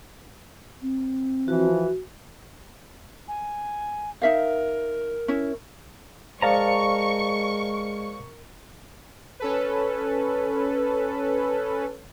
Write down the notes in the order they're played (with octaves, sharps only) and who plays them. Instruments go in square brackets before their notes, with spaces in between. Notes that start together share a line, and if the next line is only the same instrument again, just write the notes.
[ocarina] C4
[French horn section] E3 F3 [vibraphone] F#4
[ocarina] G#5
[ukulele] D#4 E5 F5 [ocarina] A#4
[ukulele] C#4 E4
[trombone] G#3 [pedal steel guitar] A#4 A5 A#5 [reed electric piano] C5 D5 F5 [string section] C#6
[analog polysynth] C#4 A4 B4